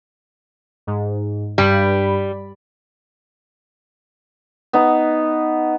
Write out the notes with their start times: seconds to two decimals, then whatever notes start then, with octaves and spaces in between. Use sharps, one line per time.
0.87 G#2
1.58 G2 G3 B5
4.73 B3 D#4